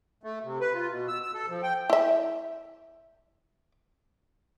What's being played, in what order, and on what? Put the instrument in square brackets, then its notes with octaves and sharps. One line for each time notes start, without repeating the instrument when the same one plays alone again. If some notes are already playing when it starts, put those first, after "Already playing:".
[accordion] A3
C3
B4
F4
B2
E6
E6
A4
F3
G5
[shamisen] E4 E5